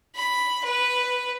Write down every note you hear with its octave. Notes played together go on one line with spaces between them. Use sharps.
B5
B4